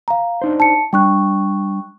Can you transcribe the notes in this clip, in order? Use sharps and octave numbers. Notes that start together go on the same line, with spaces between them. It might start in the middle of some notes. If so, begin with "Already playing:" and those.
F5 A#5
D4 D#4 C5
A5 C#7
G3 D4 G5 C#6 F#6